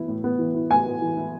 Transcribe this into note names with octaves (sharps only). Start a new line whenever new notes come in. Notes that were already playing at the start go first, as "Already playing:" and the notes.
Already playing: E3 B3 E4
A2
B3
E3
E4
A2 G#5
B3
E3
E4